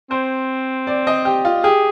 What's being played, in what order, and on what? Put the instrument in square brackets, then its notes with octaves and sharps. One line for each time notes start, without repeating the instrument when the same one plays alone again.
[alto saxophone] C4 [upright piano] C5
[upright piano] D5
D#5
G4
F4
[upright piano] G4 [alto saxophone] G#4